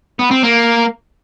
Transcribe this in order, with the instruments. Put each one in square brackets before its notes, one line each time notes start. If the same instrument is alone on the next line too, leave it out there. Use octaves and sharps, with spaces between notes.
[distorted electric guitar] B3
C4
A#3